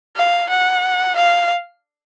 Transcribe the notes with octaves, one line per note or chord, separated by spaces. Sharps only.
F5
F#5
F5